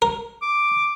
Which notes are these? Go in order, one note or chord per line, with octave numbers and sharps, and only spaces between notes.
A#4
D6